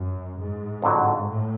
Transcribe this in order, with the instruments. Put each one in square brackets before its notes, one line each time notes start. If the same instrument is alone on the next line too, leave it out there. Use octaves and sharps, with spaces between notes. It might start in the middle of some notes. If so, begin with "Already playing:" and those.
Already playing: [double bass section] F#2
G#2
[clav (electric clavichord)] F2 D3 F#3
[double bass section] A2